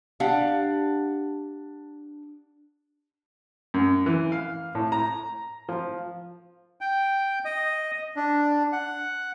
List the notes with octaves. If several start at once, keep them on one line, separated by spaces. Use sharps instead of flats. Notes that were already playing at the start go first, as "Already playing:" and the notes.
D4 G4 F5 F#5
F#2
E3
F5
A2
A#5
F3
G5
D#5
D4
F#5